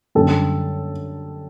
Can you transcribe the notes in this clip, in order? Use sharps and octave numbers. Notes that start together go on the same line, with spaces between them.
F#2 D3 G3 A4